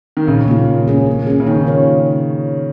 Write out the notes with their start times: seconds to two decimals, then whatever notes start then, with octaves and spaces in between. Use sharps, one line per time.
0.17 D#3
0.27 A#2 C#3
0.48 A#3 F4
0.68 D#3
0.88 A#3 C#4 G#4
1.06 A#3
1.27 C#4 G#4
1.40 C#3
1.47 D#3 A#3
1.67 F4 C#5